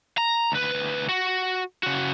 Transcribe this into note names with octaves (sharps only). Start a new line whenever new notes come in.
A#5
D2 B4
F#4
C#3 F#4